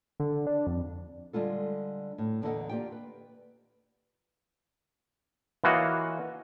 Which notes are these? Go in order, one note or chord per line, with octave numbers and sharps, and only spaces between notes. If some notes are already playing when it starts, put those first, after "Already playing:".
D3
D4
F2
D3 G3 G#3 F4 A4
A2
E2 D3 A#3 A4 D#5 F#5
A#3 F4 G4 D5 G5
B4
E3 A#3 F4 F#4 C#5 D#5